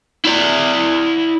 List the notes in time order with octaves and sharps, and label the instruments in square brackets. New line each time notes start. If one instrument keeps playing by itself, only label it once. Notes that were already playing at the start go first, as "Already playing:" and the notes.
[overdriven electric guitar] E4 D5